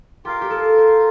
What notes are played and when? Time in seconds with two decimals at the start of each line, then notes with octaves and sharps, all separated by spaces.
0.25 F4 G4 A#4 F5
0.41 G4
0.50 A4
0.78 C5